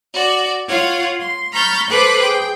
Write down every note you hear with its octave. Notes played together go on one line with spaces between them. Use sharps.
F#4 D5
F4 C#5 F5 F#5
C6
A#5 B5 C#6 F6 G6 A6
A4 B4 C5 B5 D6 F#6
G#4 G5